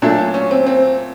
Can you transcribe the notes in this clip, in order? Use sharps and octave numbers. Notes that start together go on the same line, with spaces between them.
A#2 F#3 A3 D4
C#4
C4
C4